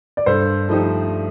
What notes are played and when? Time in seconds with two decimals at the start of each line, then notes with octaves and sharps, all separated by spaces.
0.17 D5
0.26 G2 A4 C5
0.69 F3 A3 D#4 G4